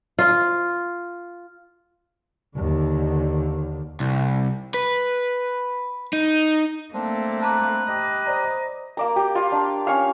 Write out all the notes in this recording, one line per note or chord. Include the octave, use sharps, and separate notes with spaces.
F4
D#2 D3
C2
B4
D#4
A3 A#3 C4 D4
B4 A5 A#5 D6
G4 D#5
C5 D5 A#5
A#3 D5 A#5
G4
F4
D4
C#4 C#5 F5